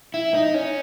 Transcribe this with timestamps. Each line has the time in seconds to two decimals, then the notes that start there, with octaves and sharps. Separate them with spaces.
0.14 E4
0.34 D#4
0.54 C#4